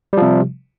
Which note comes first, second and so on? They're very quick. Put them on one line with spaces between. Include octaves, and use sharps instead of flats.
G3 F3 C3